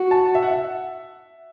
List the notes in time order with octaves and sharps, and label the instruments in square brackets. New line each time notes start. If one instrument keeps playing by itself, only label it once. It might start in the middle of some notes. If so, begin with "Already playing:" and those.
Already playing: [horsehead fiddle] F#4
[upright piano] A5
E5
F#5
E5